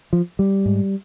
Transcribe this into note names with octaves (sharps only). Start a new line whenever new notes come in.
F3
G3
G#2